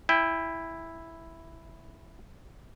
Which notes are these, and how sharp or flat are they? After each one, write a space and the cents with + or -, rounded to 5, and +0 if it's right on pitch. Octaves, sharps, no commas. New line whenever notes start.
E4 +0 G5 +35